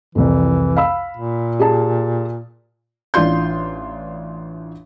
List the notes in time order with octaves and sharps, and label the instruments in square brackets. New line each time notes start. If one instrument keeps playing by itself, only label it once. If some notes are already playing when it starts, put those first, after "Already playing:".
[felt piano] C2 F2 [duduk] E3
[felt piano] F5 B5 E6
[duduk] A#2
[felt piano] G4 G#4 A5
A1 E3 D4 F4 C6 G6